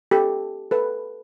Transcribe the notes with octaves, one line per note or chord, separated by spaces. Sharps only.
G4 A4
A4 B4